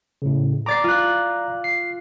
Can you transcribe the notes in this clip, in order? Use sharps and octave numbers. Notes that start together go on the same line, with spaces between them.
A2 C#3
D5 A#5 D6 A6 C7
F4 F#6
C7